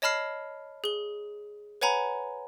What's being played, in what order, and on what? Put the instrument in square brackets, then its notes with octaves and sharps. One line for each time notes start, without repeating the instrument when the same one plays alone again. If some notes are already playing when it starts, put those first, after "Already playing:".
[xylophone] C#5 D#5 A5 B5 F6 C7
G#4 G7
B4 C#5 F#5 G#5 A#5 B5